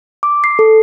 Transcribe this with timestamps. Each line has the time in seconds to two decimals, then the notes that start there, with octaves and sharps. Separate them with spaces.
0.23 D6
0.44 C7
0.59 A4